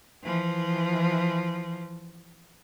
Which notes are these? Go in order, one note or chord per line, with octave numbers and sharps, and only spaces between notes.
E3 F3